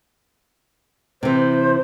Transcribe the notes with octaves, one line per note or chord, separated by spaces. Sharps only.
C3 E3 C5